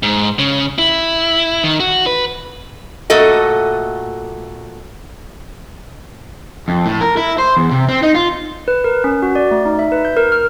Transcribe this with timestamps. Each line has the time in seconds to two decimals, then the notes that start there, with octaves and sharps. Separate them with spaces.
0.03 G#2
0.39 C#3
0.79 E4
1.64 D#3
1.80 F#4
2.06 B4
3.10 A#2 A3 F#4 A4 D#5
6.68 F2
6.86 A2
7.01 A#4
7.17 E4
7.38 C5
7.57 E2
7.71 C3
7.89 C4
8.02 D#4
8.15 F4
8.68 B4
8.84 A#4
9.04 C#4
9.22 F#4
9.35 D5
9.51 A3
9.65 D#4
9.79 E5
9.92 B4
10.05 G6
10.17 A#4
10.32 F6